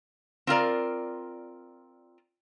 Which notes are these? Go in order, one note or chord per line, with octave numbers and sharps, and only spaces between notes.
C4 F4 A#4 D5